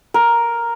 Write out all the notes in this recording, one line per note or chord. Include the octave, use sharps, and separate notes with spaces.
A#4